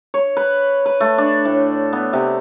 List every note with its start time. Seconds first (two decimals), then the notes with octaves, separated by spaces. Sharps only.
0.14 C#5
0.37 B4
0.86 B4
1.00 A3
1.18 D4
1.45 A2
1.93 B3
2.13 C3